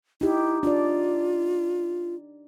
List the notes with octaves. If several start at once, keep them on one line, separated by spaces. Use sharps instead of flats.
D#4 E4 G4
D4 F4 D5